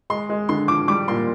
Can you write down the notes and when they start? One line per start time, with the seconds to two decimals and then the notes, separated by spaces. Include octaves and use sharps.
0.10 G#3 C6
0.29 G#3
0.49 D3 C6
0.68 F3 D6
0.88 G3 D6
1.08 A#2 C6